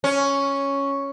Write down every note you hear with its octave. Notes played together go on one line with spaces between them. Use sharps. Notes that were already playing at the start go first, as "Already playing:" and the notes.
C#4